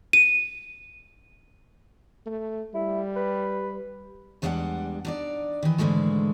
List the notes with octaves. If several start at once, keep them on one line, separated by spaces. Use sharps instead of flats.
D#7
A3
G3 E4
B4
E2 G3 G#3 D4 E5 F#5
D4 D#4 D5
D#3 E3
G#2 D3 E3 G#3 A3